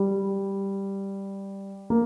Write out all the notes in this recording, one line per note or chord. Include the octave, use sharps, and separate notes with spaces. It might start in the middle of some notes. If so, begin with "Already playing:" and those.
Already playing: G3
A#3